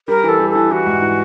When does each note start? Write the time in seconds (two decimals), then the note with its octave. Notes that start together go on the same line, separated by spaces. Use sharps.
0.08 G3 A#4
0.23 E3
0.29 A4
0.40 G3
0.50 E3 A4
0.71 E3 F#4
0.86 G#2
1.02 E3